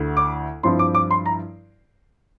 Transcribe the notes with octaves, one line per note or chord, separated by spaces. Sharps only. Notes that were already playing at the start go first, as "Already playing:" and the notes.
Already playing: D2 D3 A3 E4
D6
G2 F3 C4 E4 C6
D6
D6
C6
A#5